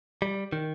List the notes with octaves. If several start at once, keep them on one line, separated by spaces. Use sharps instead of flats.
G3
D#3